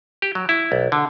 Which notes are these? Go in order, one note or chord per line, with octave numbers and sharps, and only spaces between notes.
G4
F#3
E4
B1
D3